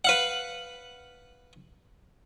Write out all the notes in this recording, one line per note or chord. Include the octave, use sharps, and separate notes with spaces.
B4 F5 F#5